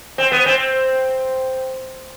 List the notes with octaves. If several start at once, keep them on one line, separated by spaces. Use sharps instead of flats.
C4
B3
C4